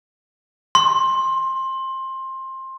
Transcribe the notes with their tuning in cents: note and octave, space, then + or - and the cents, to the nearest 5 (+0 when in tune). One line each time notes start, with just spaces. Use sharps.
C6 +20